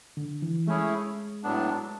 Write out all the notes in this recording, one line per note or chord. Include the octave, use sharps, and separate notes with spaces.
D3
E3
G#3 A3 C#4 E4 G#4 C#5
A2 F#3 B3 D4